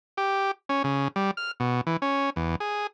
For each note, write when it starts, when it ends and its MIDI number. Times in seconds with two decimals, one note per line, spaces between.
0.17 0.51 67
0.69 0.83 61
0.84 1.08 49
1.16 1.31 55
1.37 1.51 89
1.60 1.81 47
1.87 1.97 52
2.02 2.30 61
2.36 2.56 40
2.60 2.87 68